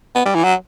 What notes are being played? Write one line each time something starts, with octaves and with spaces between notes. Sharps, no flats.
B3
G3
E3
F#3